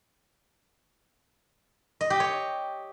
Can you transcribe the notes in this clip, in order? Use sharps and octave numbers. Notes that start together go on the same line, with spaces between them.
D#5
G4
C#5